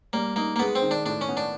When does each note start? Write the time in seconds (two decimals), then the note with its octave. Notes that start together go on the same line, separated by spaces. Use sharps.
0.13 G3 A#3
0.36 A#3 D#4
0.56 A#3
0.59 G#3 B3
0.75 C4
0.82 D#3
0.91 D4
1.06 A2 D4
1.21 C#4
1.28 B3
1.37 D4